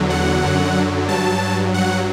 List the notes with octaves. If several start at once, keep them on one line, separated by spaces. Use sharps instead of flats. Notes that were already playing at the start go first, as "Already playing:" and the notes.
Already playing: E2 D3 F#3
F#5
F#2 D3 F#3
G2 F#3 A5
G2 F#3 F#5